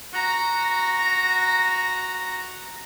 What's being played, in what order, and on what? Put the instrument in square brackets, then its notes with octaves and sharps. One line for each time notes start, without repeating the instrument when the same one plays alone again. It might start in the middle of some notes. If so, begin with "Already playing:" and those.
[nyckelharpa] F#4 A#5